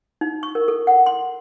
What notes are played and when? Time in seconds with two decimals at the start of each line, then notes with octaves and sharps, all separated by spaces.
0.21 D#4
0.43 C#6
0.55 A#4
0.68 A4
0.87 F#5
1.06 C6